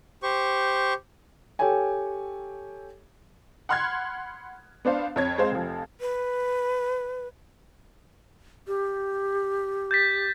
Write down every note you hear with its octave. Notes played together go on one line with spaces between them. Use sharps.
G4 C5 C#6
G4 A4 C#5 G5 G#5
F#5 B5 C6 F6 F#6 G#6
B3 D4 C5 F5
F2 C#5 G#6
G#3 C4 C5 F5
F1 F3
B4
G4
G6 A6 B6